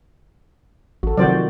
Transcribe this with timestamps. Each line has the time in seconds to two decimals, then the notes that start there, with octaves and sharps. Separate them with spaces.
1.03 A1 F#4 A4
1.18 C3 D#3 F3 F#3 F#4 C5 D5